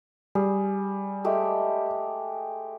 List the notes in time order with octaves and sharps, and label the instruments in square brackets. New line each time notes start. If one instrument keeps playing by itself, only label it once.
[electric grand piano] G3 [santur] G#4
[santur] G#3 A3 G4